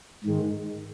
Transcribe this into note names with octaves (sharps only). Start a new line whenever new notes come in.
G#2 D#3 G#3